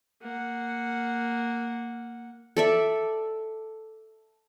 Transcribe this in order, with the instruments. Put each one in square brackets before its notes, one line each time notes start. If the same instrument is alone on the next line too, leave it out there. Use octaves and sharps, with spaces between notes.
[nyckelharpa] A#3 F#5
[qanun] A4 D5 E5